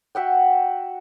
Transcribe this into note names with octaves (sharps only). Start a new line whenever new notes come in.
F#4 E5 F#5 G5